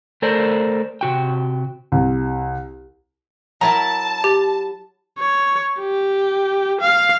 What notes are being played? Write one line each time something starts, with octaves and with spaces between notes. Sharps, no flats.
A3 A4 A#4 C5 D5
C3 F#4 G5
C2
F#3 E4 A#4 A5 A#5
G4
C#5
G4
F5